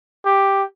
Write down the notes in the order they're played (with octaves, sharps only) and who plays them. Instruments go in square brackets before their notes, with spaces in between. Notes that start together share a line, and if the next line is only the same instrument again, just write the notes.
[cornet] G4